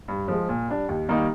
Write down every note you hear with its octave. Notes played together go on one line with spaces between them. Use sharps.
G2
F3 G#3
A#2
G3 D4
D#2
D#3 G3 A#3 D#4